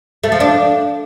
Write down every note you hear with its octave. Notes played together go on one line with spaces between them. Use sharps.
A3
F3
D4